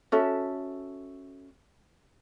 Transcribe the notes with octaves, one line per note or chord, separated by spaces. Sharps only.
C#4 F#4 A4 E5